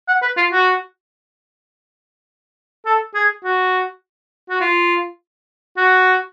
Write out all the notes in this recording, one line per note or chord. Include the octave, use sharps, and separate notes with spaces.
F#5
B4
F4
F#4
A4
G#4
F#4
F#4
F4
F#4